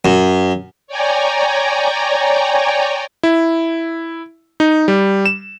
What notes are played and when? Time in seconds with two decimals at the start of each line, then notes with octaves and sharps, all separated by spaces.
0.05 F#2
0.87 C#5 D5 G5 G#5 A#5
3.23 E4
4.60 D#4
4.88 G3
5.26 E7